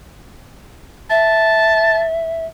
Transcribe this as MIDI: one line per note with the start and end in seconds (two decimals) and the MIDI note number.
1.10 2.45 76
1.10 2.01 81